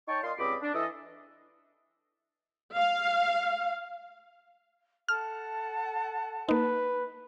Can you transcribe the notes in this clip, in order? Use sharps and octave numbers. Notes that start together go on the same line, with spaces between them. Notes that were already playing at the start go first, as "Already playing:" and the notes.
D#4 C#5 G5 A5 C#6
A#2 D#5 F5 C6
C#2 G2 C4 D#5 B5 D6
D4
E3 A4 D#5
F5
A4 F#5 A5 F6
A#3 D#4 B4